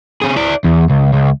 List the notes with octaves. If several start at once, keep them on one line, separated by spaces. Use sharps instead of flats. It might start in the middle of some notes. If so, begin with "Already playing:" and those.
C3 G#4
E4 D5
E2
C#2
C#2